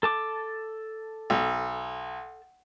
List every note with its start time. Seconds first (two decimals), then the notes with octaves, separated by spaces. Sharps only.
0.03 A4 A5 D6
1.30 B1